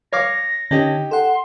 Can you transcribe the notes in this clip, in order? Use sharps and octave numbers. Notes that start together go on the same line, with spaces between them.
C#5 F5 D6 A#6
D3 C#4 D#4 G4 D#5
A4 F#5 C6